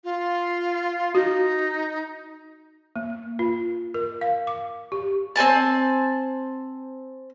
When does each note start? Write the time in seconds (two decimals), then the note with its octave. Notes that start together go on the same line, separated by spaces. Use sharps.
0.04 F4
1.15 D#4 F#4
2.96 A#3
3.39 F4
3.94 A#4
4.21 F5
4.47 D6
4.92 G4
5.36 C4 C5 G#5 A5